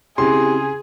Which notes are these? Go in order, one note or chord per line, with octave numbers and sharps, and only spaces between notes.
C#3 C4 E4 G4 G#4 C6